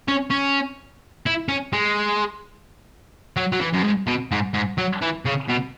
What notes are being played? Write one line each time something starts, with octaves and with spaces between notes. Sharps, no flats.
C#4
C#4
E4
C#4
G#3
F#3
F#3
E3
F#2
G#2
B2
G#2
G#2
F#3
E3
C#3
B2